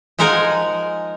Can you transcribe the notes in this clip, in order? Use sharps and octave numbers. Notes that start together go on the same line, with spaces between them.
F3 G#3 D#4 A#4 F#5 G#5